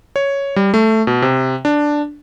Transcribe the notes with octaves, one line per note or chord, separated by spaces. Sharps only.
C#5
G3
A3
B2
C3
D4